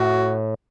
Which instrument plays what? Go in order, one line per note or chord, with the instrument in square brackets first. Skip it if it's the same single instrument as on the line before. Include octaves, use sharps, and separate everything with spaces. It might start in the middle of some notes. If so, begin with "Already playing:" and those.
Already playing: [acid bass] A2 [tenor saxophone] F#4